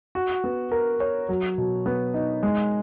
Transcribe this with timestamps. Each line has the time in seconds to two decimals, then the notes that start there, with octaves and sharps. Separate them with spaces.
0.15 F#4
0.44 B3
0.72 A#4
1.00 C#5
1.29 F#3
1.58 B2
1.86 B3
2.14 D#4
2.43 G#3